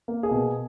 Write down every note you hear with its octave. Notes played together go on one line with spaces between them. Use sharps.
A#3
G#4
B2